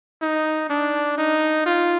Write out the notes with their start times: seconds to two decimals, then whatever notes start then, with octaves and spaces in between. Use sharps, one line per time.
0.22 D#4
0.70 D4
1.18 D#4
1.66 F4